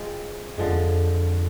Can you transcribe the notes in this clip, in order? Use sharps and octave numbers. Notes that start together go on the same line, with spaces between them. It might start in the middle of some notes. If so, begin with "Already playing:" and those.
Already playing: G#3 C4 F4
F#2 D3 F3 G#3
F2
E2
F2